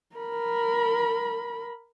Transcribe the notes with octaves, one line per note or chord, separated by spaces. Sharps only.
A#4 B5